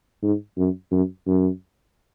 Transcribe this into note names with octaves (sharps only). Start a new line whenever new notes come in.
G#2
F#2
F#2
F#2